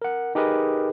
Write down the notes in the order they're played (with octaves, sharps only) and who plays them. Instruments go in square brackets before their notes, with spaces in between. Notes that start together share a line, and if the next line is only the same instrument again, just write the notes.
[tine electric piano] A#4 F#5
D#4 G4 G#4 A#4 B4 D#5